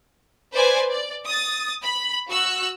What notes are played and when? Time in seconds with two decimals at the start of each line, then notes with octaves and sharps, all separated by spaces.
0.53 B4 C5 D5 G#5
0.90 D5
1.25 D#6 A6
1.81 B5
2.29 F#4 E6 F#6